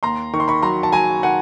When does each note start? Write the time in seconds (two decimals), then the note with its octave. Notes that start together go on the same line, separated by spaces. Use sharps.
0.03 D#2 A#5 C6
0.33 D#3 C#6
0.40 C6
0.48 B5 C#6
0.62 F#3 A#5 C6
0.83 A5
0.92 F#3 G#5 A#5
1.23 D#3 F#5 G#5